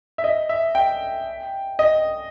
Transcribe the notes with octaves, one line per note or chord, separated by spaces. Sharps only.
E5
D#5
E5
G5
D#5